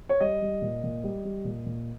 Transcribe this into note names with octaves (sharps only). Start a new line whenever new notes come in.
C#5
G3 D#5
G3
A#2
A#2
G3
G3
A#2
A#2